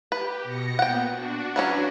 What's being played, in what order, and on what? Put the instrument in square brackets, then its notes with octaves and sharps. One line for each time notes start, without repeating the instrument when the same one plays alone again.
[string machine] G4 [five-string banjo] B4
[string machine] B2 A#6 C#7
[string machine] A#2 B3 [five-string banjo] F#5 G5
[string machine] D4 F#4
[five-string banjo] E3 F#3 C#4